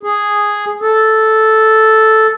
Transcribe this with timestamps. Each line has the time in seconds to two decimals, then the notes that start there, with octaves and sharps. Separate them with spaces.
0.03 G#4
0.82 A4